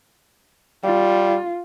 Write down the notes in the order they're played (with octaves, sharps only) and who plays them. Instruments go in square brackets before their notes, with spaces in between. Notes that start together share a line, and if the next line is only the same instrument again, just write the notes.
[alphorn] G3 [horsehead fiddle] F4